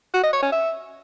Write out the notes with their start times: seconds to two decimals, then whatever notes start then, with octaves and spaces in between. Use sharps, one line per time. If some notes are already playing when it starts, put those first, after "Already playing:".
0.14 F#4
0.23 D#5
0.33 C#5
0.43 C#4
0.52 E5